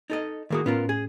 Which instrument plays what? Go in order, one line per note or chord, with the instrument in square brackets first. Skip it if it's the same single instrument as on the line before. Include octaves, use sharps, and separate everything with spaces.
[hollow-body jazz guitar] D#4 A4 D#5
[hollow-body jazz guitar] A2 A#3 F#4 [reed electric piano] D#3 G#4 D#6
[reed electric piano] A2 C#4 [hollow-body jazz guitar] B3 F4 A#4
[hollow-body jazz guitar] G#4